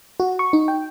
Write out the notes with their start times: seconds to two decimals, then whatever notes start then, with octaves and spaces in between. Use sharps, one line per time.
0.20 F#4
0.39 C#6
0.53 D#4
0.68 G5